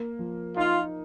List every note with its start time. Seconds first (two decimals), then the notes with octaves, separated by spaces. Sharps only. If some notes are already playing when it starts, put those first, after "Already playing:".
Already playing: A#3
0.19 F3
0.57 D#4 F4